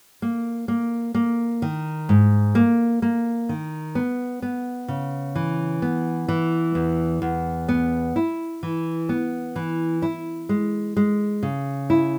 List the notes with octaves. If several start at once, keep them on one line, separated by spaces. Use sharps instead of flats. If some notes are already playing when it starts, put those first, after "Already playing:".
A#3
A#3
A#3
D#3
G#2
A#3
A#3
D#3
B3
B3
C#3
E3
B3
E3
E2
E2
B3
E4
E3
B3
E3
E4
G#3
G#3
C#3
E4